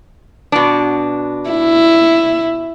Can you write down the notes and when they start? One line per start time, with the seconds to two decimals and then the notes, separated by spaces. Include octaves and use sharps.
0.52 B2 D4
1.50 E4